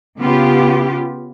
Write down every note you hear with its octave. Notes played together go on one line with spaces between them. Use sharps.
C#3 B3 F4 G4